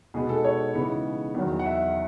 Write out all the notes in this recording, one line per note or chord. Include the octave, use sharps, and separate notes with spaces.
B2 G#3 B3 D#4 G#4
A4
C#5
C#3 E3 G#3 B3 D#4
E2 D#3 F#3
F#5
E5